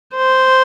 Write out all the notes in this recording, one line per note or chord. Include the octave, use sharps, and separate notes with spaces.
C5